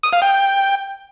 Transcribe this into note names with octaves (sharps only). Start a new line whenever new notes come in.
D#6
F5
G5